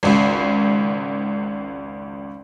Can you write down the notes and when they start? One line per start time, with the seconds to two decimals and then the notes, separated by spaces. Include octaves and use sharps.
0.03 G#1 C#2